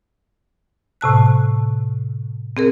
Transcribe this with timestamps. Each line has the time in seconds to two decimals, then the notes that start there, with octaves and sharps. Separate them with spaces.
1.01 A2 C3 A5 F#6
2.57 C4 G#4 A#4